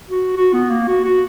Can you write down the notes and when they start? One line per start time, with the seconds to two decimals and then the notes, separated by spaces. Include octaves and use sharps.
0.10 F#4
0.36 F#4
0.53 B3
0.70 A#3
0.88 F#4
1.04 F#4